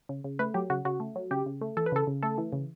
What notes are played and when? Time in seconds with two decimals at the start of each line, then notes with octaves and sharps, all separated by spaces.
0.09 C#3
0.24 C#3
0.39 A3 B4
0.54 F#3 G4
0.70 C#3 F#4
0.85 C#3 F#4
1.00 A3
1.16 F#3
1.31 C#3 G4
1.46 C#3
1.61 A3
1.77 E3 A4
1.86 B4
1.92 C#3 A4
2.07 C#3
2.23 A3 A4
2.38 E3
2.53 C#3